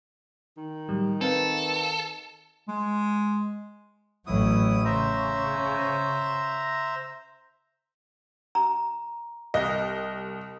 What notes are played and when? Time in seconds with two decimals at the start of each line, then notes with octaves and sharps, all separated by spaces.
0.57 D#3 D#4
0.89 A2 F#3 G3
1.21 C4 A4 B4 F5
2.68 G#3
4.27 A1 F#3 E4 D#6
4.85 C#3 C5 E5 A#5
8.55 A#5
9.54 C2 D#5